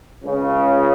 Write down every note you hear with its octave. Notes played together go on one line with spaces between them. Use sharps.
C#2 C#3